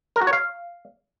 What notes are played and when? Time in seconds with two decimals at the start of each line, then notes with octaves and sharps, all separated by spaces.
0.16 A#4
0.21 F#4
0.27 C#5
0.33 F5